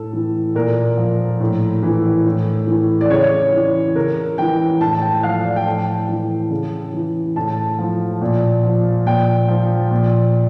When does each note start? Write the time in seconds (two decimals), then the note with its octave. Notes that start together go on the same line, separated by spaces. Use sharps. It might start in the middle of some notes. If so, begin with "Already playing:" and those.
Already playing: A2 A4
0.13 E3
0.55 A#2 A#4
0.97 F3
1.40 A2
1.83 E3
2.26 A2
2.67 E3
3.01 D5
3.10 C#3 C#5
3.53 E3
3.96 C#3 A#4
4.38 E3 G5
4.81 A2 A5
5.02 G5
5.23 F3 F5
5.44 D5
5.56 G5
5.65 A2 A5
6.09 E3
6.51 C#3
6.93 E3
7.36 A2 A5
7.78 F3
8.22 A#2
8.63 F3
9.06 A#2 G5
9.48 F3
9.91 A#2